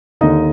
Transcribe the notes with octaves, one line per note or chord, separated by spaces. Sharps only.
D#2 D3 D#4 D#5